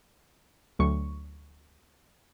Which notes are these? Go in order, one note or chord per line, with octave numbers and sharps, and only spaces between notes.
D2 F#3 C#6